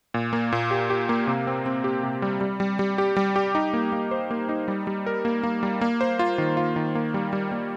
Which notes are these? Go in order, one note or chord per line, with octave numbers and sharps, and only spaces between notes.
A#2
A#3
A#2
G4
G4
A#3
C3
C4
C4
G4
C3
G3
G3
G3
G3
G4
G3
G4
D#4
A#3
A#3
C5
A#3
D#4
G3
G3
A#4
A#3
A#3
G3
A#3
C5
F4
D#3
F4
D#3
A#3
G3
G3
A#3